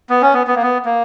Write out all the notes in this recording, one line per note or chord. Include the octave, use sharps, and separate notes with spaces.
B3
C#4
B3
B3
A#3
B3
A#3